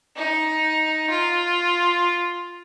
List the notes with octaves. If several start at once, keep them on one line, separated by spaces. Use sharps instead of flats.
D#4
F4